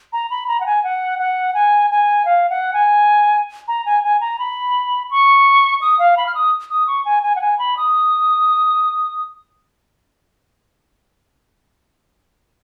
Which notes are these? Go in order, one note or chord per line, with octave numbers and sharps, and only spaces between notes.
A#5
B5
A#5
F#5
G#5
F#5
F#5
G#5
G#5
F5
F#5
G#5
A#5
G#5
G#5
A#5
B5
C#6
D#6
F5
B5
F6
D#6
D#6
C#6
G#5
G#5
F#5
G#5
B5
D#6